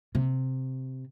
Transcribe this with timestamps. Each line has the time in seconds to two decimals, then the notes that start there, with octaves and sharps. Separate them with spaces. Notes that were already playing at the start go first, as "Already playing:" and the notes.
0.15 C3